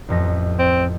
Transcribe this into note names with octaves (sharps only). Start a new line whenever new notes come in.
A1 F2 A#6
C4